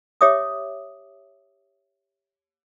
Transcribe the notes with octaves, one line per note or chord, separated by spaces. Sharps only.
G4 C#5 E5 D6 D#6